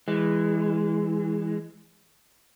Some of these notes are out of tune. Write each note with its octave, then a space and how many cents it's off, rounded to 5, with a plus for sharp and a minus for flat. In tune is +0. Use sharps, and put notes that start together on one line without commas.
E3 +0 G#3 -15